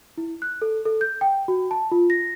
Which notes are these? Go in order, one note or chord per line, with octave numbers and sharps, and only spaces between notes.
E4
F#6
A4
A4
G6
G5
F#4
A5
F4
A#6